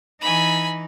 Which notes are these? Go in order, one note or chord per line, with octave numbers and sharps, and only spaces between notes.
E3 D#4 G#5 B5